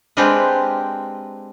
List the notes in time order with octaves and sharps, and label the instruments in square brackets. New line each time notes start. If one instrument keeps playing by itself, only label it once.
[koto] G#3 C4 D4 G4 A#4 B4